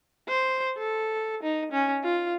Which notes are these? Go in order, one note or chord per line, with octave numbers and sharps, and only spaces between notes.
C5
A4
D#4
C#4
F4